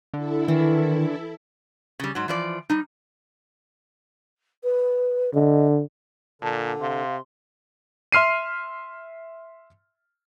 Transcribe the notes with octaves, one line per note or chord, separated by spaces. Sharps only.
D3 E4 A4
D#3 E3
C#3 G3
G#2 F#3
E3 F3 D5
G3 D#4
B4
D3 D#5
A#2 D3 A5
C3 F5 C6
E5 C6 F6 C7 D#7